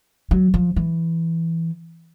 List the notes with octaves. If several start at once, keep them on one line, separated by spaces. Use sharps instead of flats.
F#3
F3
E3